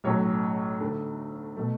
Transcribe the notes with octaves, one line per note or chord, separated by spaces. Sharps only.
B1 A2 F#3 C#4 C#5
D2 D3 A3
B2 A3